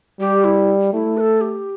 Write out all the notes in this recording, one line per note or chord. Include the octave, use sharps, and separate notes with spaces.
G3 G4
E4
A3 E4
B4
A4
G4